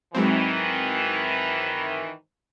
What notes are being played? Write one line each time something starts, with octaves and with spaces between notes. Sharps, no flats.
G#2 D#3 E3 F#3 C4